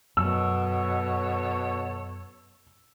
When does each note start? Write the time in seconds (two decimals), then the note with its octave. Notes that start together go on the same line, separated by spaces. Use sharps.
0.17 F#2 B2 A4 C#5 E6